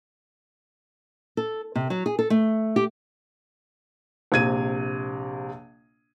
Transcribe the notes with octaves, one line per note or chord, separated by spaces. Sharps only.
A4
C3
F#3
G#4
A4
A3
G4
A#1 C3 G#6 D#7